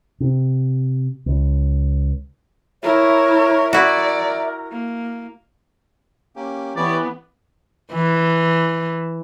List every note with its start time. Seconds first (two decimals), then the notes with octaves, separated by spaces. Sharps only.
0.20 C3
1.26 C#2
2.83 E4 A#4 C#5 E5
3.73 E4 F#4 A#4 D5
4.71 A#3
6.36 A#3 C#4 G4
6.77 E3 B3 G4 B4 C#5 D5
7.92 E3